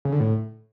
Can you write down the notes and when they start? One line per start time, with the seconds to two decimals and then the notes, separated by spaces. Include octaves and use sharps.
0.05 C#3
0.13 D3
0.20 A2